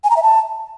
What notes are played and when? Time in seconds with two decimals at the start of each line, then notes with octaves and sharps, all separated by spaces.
0.04 G#5
0.10 A#5
0.17 E5
0.23 A5